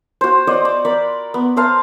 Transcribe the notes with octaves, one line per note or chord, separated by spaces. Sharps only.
F#4 C5
C5 D5 D#5 F#5
D6
A#4 D5 B5 D6
B3
A#4 C5 F5 A5